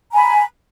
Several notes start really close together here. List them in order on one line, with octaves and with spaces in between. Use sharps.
A#5 G#5 B5